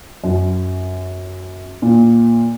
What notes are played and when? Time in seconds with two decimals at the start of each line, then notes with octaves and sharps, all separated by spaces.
0.24 F#2
1.82 A#2